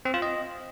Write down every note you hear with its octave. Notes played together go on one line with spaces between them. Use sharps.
C4
F4
D#5